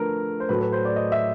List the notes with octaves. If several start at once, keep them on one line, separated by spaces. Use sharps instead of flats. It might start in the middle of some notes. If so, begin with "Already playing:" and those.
Already playing: D3 F3 A3 A#4 B4
C5
A2 F#3 A3 B4
B4
C5
D5
D#5
E5